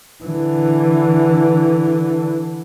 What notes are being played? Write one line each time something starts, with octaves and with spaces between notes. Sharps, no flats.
D3 E3